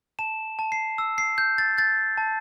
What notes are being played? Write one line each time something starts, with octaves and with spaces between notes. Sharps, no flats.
A5 E7
A5
C7
E6
C7
G6
A6
G6 A6
A5